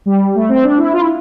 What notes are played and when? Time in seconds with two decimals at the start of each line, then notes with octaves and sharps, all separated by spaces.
0.06 G3
0.35 A3
0.49 C4
0.63 D4
0.78 E4
0.93 F4
1.00 E4